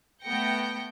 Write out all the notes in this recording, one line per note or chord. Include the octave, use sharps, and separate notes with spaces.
A3 B3 G5 G6 A#6 C#7